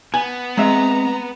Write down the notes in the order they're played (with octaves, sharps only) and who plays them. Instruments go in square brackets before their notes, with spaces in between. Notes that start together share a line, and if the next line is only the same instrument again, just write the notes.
[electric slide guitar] B3 [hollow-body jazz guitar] G#5
[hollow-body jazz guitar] G#3 E5 [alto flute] C4 [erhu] A#5